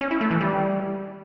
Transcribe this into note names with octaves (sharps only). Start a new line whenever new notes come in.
C#4
E4
A3
E3
G3